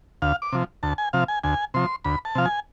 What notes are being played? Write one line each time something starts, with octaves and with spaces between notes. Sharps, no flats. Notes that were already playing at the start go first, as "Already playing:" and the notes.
D2 F5
D6
C3 F3
D2 A5
G#5
C3 F3 F5
G#5
D2 G#5
C3 F3 C6
D2 B5
A5
C3 F3 F5
G#5